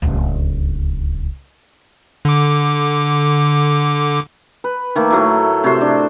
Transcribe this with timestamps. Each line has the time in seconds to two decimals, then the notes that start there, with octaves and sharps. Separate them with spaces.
0.02 D1 C#2
2.25 D3 D6
4.64 B4
4.96 D#3 A3 A#3
5.10 A2 F#3 A3
5.64 C3 F#4 C5 C6
5.81 D4